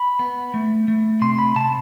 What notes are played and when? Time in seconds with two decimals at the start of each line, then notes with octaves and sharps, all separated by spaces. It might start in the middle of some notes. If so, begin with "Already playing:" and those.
Already playing: B5
0.19 B3
0.54 A3
0.88 A3
1.21 C3 C6
1.39 B5
1.56 C3 A5